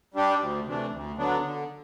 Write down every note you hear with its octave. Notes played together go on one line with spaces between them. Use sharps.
G3 D4 G4
D2
C3 E3 A3 D4
D2
D3 F#3 B3 D4
D3